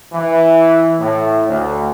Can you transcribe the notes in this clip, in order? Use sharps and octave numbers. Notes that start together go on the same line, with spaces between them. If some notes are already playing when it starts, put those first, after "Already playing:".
E3
A2
D2